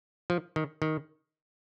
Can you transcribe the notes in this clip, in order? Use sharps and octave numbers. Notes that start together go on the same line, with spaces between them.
F3
D#3
D#3